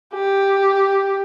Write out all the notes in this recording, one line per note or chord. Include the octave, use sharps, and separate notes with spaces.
G4